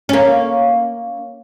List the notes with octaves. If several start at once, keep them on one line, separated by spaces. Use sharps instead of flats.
A#3 C#4